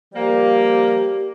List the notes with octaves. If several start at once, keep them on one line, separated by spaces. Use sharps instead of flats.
F3 G3 A#3 G4